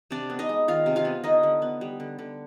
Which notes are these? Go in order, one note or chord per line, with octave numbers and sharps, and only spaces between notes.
C3 D4 D5
B3
D#4 D#5
G#3
D#3 F4 F5
C3
F4 F5
B3
D3 D#4 D#5
D3
B3
G3
D3
D3